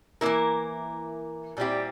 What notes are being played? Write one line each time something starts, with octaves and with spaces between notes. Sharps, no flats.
E3 A#3 E4 A#4
A#2 G3 C4 E4 G4